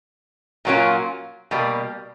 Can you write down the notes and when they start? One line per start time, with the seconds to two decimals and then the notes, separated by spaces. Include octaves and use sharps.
0.65 A#2 F#3 A#3 C#4 F4
1.51 B2 G3 A#3